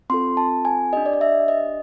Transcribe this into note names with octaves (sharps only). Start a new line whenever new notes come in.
C4 F4 A4 C6
A5
G#5
D4 G4 D#5
D5
D#5
E5
D#5